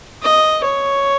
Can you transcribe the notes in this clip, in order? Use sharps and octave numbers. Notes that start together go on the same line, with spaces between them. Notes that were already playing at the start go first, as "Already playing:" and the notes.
D#5
C#5